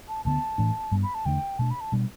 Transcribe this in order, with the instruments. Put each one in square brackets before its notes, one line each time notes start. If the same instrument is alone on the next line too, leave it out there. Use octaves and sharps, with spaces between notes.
[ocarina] A5
[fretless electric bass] D2 D3 B3 [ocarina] A5
[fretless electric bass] A2 E3 A3 D4
G2 G3 B3 D4
[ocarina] B5
A5
[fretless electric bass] E2 D3 A3 D4 [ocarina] G5
[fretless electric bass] B2 A3 D4 [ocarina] A5
[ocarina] B5
A5
[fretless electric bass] B2 G3 D4